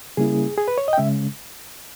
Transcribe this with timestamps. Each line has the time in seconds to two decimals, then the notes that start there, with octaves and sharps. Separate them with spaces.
0.17 C#3 G3 A#3 C#4 E4 G#4
0.57 G#4
0.68 B4
0.78 C#5
0.88 D#5
0.93 G5
0.98 C#3 G#3 C#4 E5